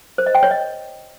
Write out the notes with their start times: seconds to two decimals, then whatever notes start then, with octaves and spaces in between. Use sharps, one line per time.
0.18 C5
0.26 D#5
0.35 G5
0.43 C#5
0.51 D#5